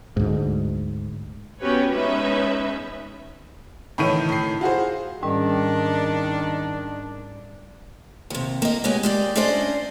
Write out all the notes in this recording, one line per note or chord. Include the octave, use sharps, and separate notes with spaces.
D2 G#2
B3 C#4 F#4 G4 B4 C#5
G#3 B3 C#4 D#4 B4 E5
A2 D#3 E3 C#5 D#7
A2 C7
F4 F#4 G#4 C5
G#2 D#3 G3 C#4 D4
D#2 C3
A#3 D#5
G#3 B3 G4 C#5 G#5
G#3 G4 D5
C#4 D4 E4 C5 D5 D#5